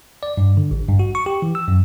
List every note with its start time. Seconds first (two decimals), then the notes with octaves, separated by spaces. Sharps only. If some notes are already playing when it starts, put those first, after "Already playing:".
0.23 D5
0.37 G2
0.57 D3
0.71 A1
0.88 G2
0.99 F#4
1.15 C#6
1.26 G4
1.42 E3
1.55 E6
1.68 F#2